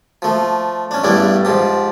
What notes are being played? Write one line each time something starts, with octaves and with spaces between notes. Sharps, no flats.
F3 A3
C#4 D4
E2 G2 G3 A3 D4 E4
G#2 F3 G4